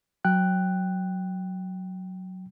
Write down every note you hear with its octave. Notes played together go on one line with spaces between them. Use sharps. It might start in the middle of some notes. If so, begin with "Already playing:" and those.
F#3 G5 F#6